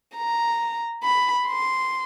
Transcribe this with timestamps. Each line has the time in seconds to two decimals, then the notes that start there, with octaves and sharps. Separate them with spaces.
0.17 A#5
1.04 B5
1.47 C6